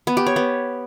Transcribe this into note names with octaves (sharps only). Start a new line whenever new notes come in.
B3
G4
C#5
B3